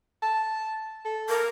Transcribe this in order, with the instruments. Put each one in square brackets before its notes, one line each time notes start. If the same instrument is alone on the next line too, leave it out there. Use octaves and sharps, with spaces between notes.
[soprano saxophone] A5
A4
[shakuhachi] A#4